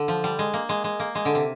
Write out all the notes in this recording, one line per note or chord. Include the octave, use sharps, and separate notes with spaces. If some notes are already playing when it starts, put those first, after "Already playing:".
Already playing: D3
F3
G3
G#3
A#3
G#3
G#3
A#3
G#3
D3
C3